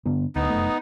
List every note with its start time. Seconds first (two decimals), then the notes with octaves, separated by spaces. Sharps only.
0.06 G2 D3 B3
0.35 D1 D2 B3 D#4
0.50 F1 F#2 A3